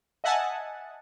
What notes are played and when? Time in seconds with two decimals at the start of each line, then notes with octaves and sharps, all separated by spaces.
0.24 D#5 E5 F#5 G#5 A5